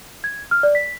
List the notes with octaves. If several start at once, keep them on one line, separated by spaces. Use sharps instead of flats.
G#6
F6
D5
B6